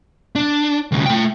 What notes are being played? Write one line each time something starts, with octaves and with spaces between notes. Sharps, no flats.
D4
D2 C#3
A3 G5